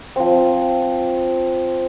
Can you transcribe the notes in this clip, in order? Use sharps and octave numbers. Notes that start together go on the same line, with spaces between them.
F3 C4